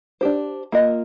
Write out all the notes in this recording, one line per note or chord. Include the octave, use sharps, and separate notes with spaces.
D4 G4 C5
A#3 F4 A#4 D#5